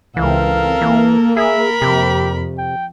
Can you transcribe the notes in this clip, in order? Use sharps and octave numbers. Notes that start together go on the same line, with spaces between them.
C#2 E3 C4 A4 A#4 F5
E3 A#3
G#4 A#4 E5 B5
F2 C3 G4
G5